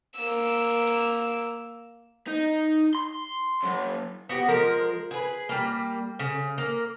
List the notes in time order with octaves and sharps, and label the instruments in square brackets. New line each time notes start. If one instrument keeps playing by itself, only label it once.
[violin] A#3 E6
[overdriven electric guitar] D#4
C6
C#3 F#3
[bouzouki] B3 F#4 G4
F3 G#3 A#4
G#4 B4
G3 A#3
C#3
A#3